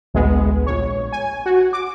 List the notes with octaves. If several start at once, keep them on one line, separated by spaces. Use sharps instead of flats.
A1 D2 G#3 B3
A#1 C#5
G#5
F#4
D6